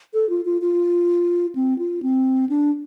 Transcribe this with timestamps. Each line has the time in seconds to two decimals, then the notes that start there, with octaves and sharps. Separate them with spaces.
0.14 A4
0.29 F4
0.45 F4
0.62 F4
1.55 C4
1.79 F4
2.03 C4
2.49 D4